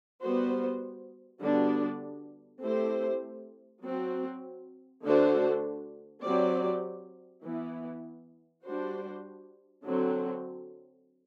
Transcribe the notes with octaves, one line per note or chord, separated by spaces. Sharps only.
G3 B3 F#4 C5
D3 G3 B3 D4 F#4
A3 C4 E4 G4 C5
F#3 C4 F#4
D3 A3 D4 F#4 C5
F#3 C4 G4 D5
E3 B3 E4
G3 D4 F#4 C5
D3 F#3 C4